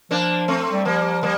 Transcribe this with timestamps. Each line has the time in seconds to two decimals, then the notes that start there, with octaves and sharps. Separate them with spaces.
0.11 F3 A#3 D4
0.48 A3 C4
0.72 G3
0.85 F3 G3 A#3
1.23 G3 A#3